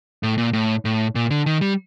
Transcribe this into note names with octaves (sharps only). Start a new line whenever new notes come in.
A2
A#2
A2
A2
A#2
D3
D#3
G3